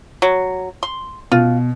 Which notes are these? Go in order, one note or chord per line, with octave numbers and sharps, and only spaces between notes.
F#3
C6
B2 F4